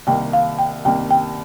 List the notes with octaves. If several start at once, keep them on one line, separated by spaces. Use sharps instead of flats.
C2 C3 D#3 A#3 G5
F5
G5
C2 C3 D#3 A#3 G5
G5